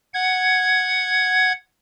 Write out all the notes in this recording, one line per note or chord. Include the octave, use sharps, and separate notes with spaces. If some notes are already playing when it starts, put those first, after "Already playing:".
F#5 G#6